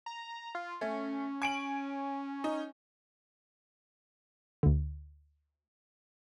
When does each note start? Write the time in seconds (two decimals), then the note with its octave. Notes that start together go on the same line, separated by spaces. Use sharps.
0.06 A#5
0.55 F4
0.81 A3 C#4
1.42 G#5 D7 F#7
2.44 D#4
4.63 D2 D3